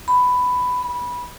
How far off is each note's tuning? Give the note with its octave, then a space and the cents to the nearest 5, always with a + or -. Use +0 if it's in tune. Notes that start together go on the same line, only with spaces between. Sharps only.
B5 +10
B5 -15